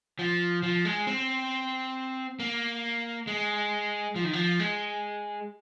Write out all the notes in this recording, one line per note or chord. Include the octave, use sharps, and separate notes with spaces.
F3
F3
G#3
C4
A#3
G#3
F3
D#3
F3
G#3